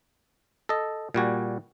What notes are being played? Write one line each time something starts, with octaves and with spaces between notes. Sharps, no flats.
A4 D#5
A#2 G3 F#4 G#5